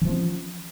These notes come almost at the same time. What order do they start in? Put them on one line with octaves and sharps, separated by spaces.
E3 F3 C4 C#4